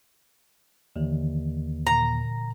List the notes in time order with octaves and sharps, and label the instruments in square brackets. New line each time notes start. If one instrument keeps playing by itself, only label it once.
[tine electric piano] D#2 [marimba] D3 E3
[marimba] A#2 [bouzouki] A#5